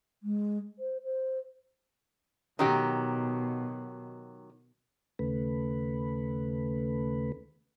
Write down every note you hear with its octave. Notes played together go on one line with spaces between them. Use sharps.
G#3
C5
C5
B2 D#3 F#3 G4
D#2 C#3 A3 B4